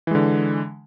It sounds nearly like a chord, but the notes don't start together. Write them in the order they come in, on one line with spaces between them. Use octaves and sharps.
E3 G#3 D3